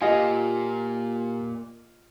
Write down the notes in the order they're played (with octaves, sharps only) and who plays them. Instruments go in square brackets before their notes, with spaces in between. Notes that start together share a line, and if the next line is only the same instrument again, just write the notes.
[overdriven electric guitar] A#2 [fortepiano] F4 D#5 [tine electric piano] G4 G#5